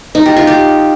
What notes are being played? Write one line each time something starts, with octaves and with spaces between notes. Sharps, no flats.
D#4
G4
F4
G4